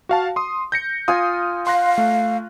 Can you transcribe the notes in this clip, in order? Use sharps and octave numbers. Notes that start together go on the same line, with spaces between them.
F#4 F5 A5
C6 D#6
G6 A#6 C#7
F4 G#5 D#6
F5 C6 F#6 A#6
A3